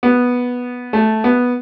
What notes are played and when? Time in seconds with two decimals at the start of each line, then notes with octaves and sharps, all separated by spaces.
0.03 B3
0.93 A3
1.24 B3